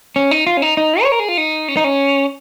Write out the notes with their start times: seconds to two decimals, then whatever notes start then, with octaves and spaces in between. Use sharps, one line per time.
0.16 C#4
0.31 D#4
0.47 F4
0.57 C#4
0.62 D#4
0.77 D#4
1.03 C#5
1.12 A#4
1.20 G#4
1.28 F4
1.37 D#4
1.68 C#4
1.77 D#4
1.84 C#4